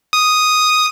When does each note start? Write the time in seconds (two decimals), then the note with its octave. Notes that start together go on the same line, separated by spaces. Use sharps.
0.13 D#6